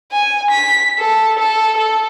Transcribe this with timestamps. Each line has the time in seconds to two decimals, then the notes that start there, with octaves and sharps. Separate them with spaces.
0.12 G#5
0.50 B6
0.99 A4
1.39 A4
1.78 A4